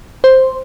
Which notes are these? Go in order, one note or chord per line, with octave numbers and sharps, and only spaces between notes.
C5